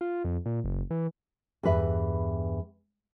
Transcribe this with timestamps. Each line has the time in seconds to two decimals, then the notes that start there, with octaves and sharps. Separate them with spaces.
0.01 F4
0.25 F2
0.46 A#2
0.64 F#1
0.91 E3
1.63 E2 G2 B4 E5